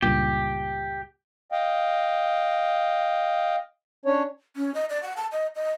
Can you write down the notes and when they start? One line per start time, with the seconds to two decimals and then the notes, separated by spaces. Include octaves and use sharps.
0.02 C#2 G2 A#2 G4
1.52 D#5 F5 G5
4.05 C#4 D4 C#5
4.56 C#4
4.75 D#5
4.90 D5
5.03 F#5
5.17 A5
5.32 D#5
5.55 D#5